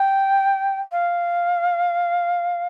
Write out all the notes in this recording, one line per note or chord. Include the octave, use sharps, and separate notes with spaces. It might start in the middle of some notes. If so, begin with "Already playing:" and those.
Already playing: G5
F5